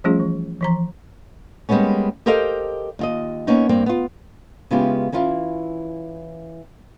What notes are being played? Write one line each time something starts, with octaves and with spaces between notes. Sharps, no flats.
F3 G3 A3 C#4 F4 G#4
E3
E3 F3 A#5
G3 G#3 A#3 B3 C#4
G4 A4 A#4 C5 D#5 F5
D#2 F4 D#5
A#3 B3 C#4 D#4
G2 A#3 C4
B3 F4
C#3 G#3 B3 E4 F4 G4
E3 C#4 E4 F4